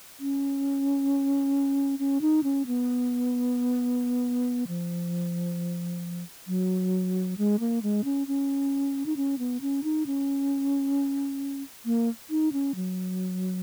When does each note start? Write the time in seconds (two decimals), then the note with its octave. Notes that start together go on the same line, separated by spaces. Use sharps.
0.20 C#4
1.99 C#4
2.21 D#4
2.43 C#4
2.67 B3
4.68 F3
6.48 F#3
7.38 G#3
7.60 A#3
7.83 G#3
8.04 C#4
8.27 C#4
9.06 D#4
9.16 C#4
9.39 B3
9.61 C#4
9.84 D#4
10.06 C#4
11.86 A#3
12.30 D#4
12.53 C#4
12.75 F#3